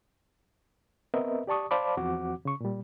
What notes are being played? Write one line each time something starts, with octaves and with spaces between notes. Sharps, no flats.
B3 C4 A#4 B4 D#5 E5
G4 D5 A5 C#6 D#6
C5 D5 F5 A5 B5 D6
E2 F3 C4 F#4 F#5 D6
C#3 C#6
A#2 G3